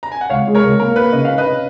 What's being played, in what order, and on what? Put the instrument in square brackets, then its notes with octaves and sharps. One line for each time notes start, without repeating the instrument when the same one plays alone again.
[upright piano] A#5
G#5
F#5
[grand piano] C#2 [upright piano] C#5 F5
[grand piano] G#3
[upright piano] A#4 C#5
[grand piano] C#2
[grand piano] A#3 [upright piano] A#4
[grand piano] A#3 [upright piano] B4
[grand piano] C#3 [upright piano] D#5
[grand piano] C#4 [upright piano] F5
[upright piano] B4 D#5
[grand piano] C#4